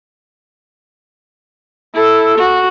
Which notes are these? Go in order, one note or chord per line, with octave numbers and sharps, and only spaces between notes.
E4 A4
F#4